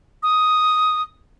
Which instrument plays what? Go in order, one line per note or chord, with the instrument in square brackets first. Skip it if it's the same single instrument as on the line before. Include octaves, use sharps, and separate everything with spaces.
[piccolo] D#6